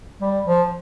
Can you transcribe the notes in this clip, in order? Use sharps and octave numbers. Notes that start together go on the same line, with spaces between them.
G3
F3